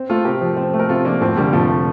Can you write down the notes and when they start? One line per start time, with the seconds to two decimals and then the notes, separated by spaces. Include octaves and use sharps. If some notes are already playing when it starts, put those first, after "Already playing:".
Already playing: C4
0.10 A3 F4 A4
0.25 C3 G4 A#4
0.41 F3
0.57 C4
0.74 A3
0.80 A#4
0.89 C3 F4 A4
1.05 F3 A#3 D4
1.21 F1 A3 C4
1.37 D3 G3 A#3
1.53 F1 F3 A3